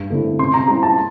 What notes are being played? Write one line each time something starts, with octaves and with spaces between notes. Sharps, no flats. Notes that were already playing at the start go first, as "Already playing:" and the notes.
Already playing: G2
D3 A3 C4 E4
C3 C6
A#5
G3 C4 E4 A#5
A5